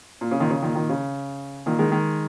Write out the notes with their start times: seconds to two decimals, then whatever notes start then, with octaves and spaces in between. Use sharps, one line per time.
0.21 A#2
0.31 C#3
0.40 A#2 D#3
0.50 C#3
0.62 A#2 D#3
0.75 A#2 D#3
0.89 C#3
1.66 A#2 D#3
1.79 D#3 G#3
1.91 D#3 G#3